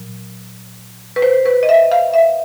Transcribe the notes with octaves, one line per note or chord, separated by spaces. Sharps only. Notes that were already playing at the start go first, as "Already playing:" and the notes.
Already playing: A#2 F#3
B4
C5
B4
D#5
E5
F5
E5